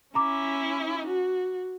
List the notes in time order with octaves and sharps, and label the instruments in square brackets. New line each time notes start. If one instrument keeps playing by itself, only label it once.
[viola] C#4 E4 [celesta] A#5 D6
[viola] F#4